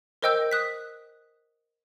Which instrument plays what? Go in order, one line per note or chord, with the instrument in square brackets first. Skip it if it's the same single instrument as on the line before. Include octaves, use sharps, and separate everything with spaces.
[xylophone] A#4 C5 D#5 G5 E6 G6
D#6 F#6 B6